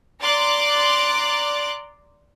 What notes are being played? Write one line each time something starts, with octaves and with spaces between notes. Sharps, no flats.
D5 A#5 C6 D6 F#6 A6